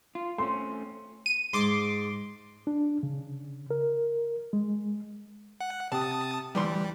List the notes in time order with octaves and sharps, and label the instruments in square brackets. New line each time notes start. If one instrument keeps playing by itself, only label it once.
[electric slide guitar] F4
[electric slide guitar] A3 C4 C#4 [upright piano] C6
[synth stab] D#7
[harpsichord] G#2 [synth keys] C6 D6
[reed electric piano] D4
C#3
A#4
G#3
[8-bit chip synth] F#5
[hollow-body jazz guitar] C3 [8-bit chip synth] A5 D#6
[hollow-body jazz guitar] D2 E3 C6 [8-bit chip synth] G3